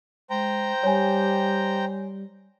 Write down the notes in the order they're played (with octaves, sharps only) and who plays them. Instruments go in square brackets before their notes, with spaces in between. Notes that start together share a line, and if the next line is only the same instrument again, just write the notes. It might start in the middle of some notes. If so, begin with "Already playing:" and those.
[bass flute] G#3 [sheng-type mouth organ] C5 G5 A#5
[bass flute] G3 [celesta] C#5 G#5